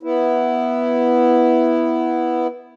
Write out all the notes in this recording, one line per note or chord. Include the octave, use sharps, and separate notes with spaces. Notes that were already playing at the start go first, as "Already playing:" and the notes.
B3 E4